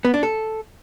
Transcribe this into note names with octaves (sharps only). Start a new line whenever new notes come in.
B3
D4
A4